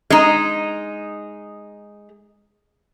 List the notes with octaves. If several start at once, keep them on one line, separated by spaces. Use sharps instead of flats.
G#3 D#4